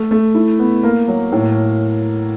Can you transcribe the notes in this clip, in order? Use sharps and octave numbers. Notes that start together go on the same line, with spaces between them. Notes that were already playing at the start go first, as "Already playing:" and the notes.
Already playing: A3
A3
E4
B3
A#3
F#3
A2